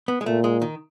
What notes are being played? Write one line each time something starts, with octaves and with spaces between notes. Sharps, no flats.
B3
G#3
A#2 A3
G#3
D#3